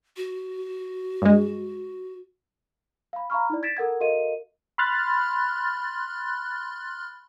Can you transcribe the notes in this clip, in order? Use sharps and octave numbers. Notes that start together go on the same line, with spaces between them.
F#4
G2 G#3
F5 B5
F5 A#5 B5 C#6 F6
D#4 E4 D5
G#6 A6 B6 D7 E7
A4 A#4 F#5 G#6
F#4 A4 A#4 D#5 F5 D#7
B5 C6 F6 F#6 A6